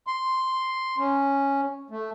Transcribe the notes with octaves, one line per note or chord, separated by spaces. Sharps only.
C6
C#4
A3